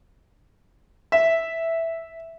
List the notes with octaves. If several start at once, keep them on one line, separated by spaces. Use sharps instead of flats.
E5